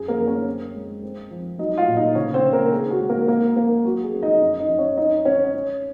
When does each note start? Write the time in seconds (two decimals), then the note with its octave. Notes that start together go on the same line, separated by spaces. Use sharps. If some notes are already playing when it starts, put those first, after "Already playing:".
Already playing: F#2 G#4
0.08 A#3 A#4
0.18 F#2
0.27 C#4 C#5
0.47 C4
0.74 G#3
1.03 C4
1.31 F3
1.59 F#3 D#4 D#5
1.77 F4 F5
1.87 A#2
1.97 D#4 D#5
2.15 C#3 C#4 C#5
2.34 C4 C5
2.44 C#3
2.53 A#3 A#4
2.72 D#3 G#4
2.91 F#4
3.00 G#3
3.09 A#3 A#4
3.28 A#3 A#4
3.56 A#3 C#4 A#4
3.85 F#3 F#4
4.03 G#4
4.13 C#4
4.22 D#4 D#5
4.41 F#2
4.60 D#4 D#5
4.69 F#2
4.79 C#4 C#5
4.97 C#4 D#4 D#5
5.25 C#4 C#5
5.54 C#4